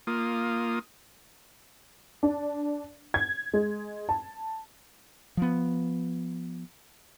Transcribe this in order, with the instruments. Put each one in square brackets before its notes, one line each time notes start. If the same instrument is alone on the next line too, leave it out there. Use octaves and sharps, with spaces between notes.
[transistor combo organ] A#3 F4 D#6
[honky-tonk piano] D4
G#6
G#3
A5
[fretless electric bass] F3 B3